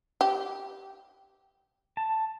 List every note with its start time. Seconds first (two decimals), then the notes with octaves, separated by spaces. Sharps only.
0.21 G4
1.97 A5